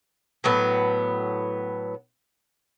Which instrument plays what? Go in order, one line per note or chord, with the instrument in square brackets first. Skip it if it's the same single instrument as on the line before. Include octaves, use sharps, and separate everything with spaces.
[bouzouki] A2 F#3 B3